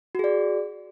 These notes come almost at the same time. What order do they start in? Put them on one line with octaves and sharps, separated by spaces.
F#4 G#4 D5